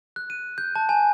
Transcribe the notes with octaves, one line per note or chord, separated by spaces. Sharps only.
F#6
D#7
G6
A5
G#5